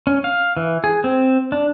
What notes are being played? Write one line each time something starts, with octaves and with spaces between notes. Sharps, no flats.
C#4
F5
E3
G#4
C4
D4